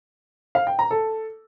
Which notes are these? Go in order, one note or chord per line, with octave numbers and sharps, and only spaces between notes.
F5
G5
A#5
A4